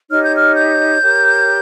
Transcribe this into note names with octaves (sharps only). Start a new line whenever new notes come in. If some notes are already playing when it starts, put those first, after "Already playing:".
D#4 G4 C#5 F6
G6
F6
G6
G4 A#4 C#5